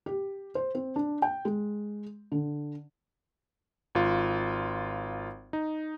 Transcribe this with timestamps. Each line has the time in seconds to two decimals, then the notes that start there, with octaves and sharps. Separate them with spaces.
0.06 G4
0.55 C5
0.75 C4
0.96 D4
1.22 G5
1.45 G#3
2.32 D3
3.95 G#1 F4
5.53 D#4